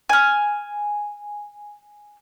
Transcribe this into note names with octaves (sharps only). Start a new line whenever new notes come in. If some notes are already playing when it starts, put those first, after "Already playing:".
G#5 F6